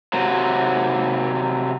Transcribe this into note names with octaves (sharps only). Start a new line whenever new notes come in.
C3 F#3